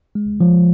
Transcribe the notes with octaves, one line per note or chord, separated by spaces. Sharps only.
G#3
F3